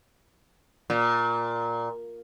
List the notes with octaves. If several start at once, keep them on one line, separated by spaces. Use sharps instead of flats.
A#2